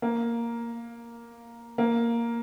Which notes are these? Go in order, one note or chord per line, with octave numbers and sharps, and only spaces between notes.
A#3
A#3